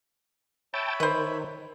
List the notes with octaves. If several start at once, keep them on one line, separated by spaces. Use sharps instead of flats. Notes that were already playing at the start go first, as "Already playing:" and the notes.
C#5 E5 G5 A5 B5
D#3 B4 C5